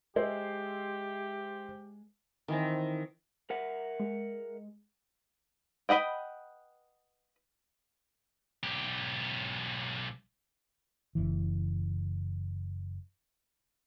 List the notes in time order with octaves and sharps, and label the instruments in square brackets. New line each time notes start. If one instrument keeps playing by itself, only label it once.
[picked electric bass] G#3 [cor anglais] G4 [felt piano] C5 D#5 E5
[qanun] D#3 E3 C4
[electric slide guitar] A#4 E5 F#5
[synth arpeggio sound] G#3
[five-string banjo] B4 D#5 F#5 G5
[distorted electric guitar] B1 G4
[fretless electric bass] F#1 C#2 E3